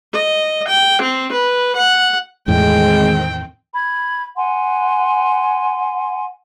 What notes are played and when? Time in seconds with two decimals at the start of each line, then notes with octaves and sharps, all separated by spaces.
0.14 D#5
0.69 G5
1.02 C4
1.33 B4
1.77 F#5
2.48 E2 A2 D#3 G#3 C4 G5
3.74 B5 G#6
4.36 F#5 G#5 C6